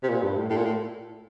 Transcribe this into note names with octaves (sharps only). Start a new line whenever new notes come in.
C3
A#2
G2
A2
A2
A#2
A2